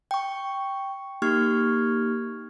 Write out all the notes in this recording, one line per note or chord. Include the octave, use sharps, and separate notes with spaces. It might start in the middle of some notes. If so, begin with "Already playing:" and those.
G5 C#6
A#3 D#4 G4 C#6 F6 G#6